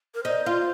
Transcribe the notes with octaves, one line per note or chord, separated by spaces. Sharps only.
A#4
D#4 C5
F4